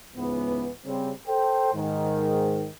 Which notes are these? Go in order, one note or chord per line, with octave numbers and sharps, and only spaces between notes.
C#2 G#2 E3 B3
C#3 G3 C4
A4 C5 G5
G#2 D#3